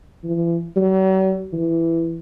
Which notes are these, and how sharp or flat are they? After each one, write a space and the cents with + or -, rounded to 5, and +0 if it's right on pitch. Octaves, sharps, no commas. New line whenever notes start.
E3 +40
F#3 +45
E3 +10